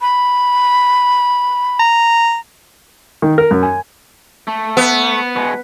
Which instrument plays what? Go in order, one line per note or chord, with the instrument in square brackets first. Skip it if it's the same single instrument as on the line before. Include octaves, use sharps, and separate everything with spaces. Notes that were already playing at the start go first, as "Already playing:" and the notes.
[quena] B5
[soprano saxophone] A#5
[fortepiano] D#3
A#4
F#2
G#5
[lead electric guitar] A3
[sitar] B3
[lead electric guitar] B2 G#3